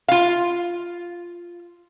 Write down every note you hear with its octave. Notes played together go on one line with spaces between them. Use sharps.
F4 F5